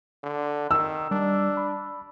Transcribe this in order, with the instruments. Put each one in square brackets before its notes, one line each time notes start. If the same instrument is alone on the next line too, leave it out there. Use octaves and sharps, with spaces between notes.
[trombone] D3
[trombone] D#3 [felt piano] E6
[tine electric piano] G3 [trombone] D4
[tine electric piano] B5